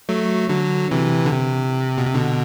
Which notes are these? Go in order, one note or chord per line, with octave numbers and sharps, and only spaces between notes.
F#3 A3
D3 F#3
C3 E3
D3
C3
B2
C3
B2 D3